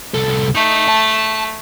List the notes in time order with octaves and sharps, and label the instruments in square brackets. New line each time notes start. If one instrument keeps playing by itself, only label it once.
[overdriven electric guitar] C2 A4
[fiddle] A3 [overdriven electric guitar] D#4
[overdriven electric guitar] A5